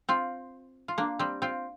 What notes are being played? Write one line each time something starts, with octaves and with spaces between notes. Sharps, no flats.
C4 F4
F4
A#3 D4
G3 C4
C4 F4